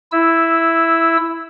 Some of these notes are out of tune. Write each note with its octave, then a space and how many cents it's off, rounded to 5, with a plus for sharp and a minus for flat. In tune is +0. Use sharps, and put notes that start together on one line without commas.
E4 +0 E6 -10